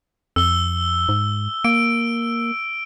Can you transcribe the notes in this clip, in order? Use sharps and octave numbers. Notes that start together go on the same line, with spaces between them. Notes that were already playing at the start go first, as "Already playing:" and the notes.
F2 E6 G7
G#2
A#3 D7